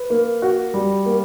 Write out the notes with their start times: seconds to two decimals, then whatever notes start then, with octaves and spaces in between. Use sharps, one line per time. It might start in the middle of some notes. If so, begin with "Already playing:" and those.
Already playing: B4
0.10 A#3
0.42 F#4
0.74 G3
1.06 A#3